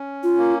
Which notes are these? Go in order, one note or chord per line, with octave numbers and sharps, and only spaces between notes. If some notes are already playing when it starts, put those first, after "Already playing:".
Already playing: C#4
F4
A#3